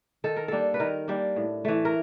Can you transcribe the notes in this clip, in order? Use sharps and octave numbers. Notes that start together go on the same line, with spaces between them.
D#3 A4
A#4
G3 A#3 D4 A4
B4
D#3 A#4
G3 A#3 D4
A2
E3 A3
A#4